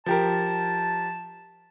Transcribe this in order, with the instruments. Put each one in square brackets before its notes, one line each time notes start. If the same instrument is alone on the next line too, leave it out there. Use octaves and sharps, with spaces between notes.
[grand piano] F3 G4 A#4 [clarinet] A5